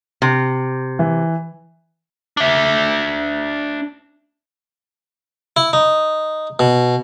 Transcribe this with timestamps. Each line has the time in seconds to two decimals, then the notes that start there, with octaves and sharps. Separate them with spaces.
0.22 C3
0.99 E3
2.37 D4 E5
5.57 E4
5.73 D#4
6.59 B2